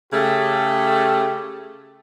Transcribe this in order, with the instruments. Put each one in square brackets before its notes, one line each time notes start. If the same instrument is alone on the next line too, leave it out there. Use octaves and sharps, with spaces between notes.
[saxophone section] C#3 A3 [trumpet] G4